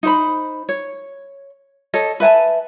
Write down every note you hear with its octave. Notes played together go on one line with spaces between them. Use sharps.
D#4 C5 B5
C#5
A4 C#5 D#5
B4 E5 G#5 A5